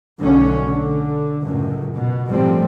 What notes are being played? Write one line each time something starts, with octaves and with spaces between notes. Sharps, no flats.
B1 D3 A3 C#4
D3
C#2 F#2 A2
B2
G#1 A2 F3 G3 C4